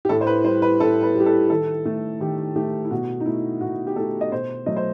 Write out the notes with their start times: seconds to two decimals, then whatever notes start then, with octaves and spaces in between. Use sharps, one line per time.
0.05 G4
0.09 A2 A4
0.21 C5
0.27 B4
0.44 G3 C5
0.62 B4
0.80 A2 A4
1.03 B4
1.15 G3
1.20 G4
1.26 A4
1.50 D#3 A4
1.85 A3
2.20 D#3 G4
2.56 A3 G4
2.85 E4
2.91 B2 F#4
3.20 D#4
3.26 A3 E4
3.61 B2 F#4
3.87 G4
3.96 A3 A4
4.21 D#5
4.31 B2 C5
4.66 F#3 A3 D#5
4.77 C5